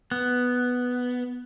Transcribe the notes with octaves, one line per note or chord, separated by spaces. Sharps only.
B3